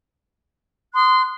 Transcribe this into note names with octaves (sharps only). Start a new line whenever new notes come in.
C6 D#6 F#6